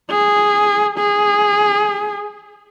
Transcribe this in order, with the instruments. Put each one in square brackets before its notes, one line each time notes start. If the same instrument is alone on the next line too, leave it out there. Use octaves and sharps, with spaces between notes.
[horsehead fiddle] G#4
G#4